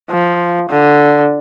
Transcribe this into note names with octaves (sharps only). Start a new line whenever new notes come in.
F3
D3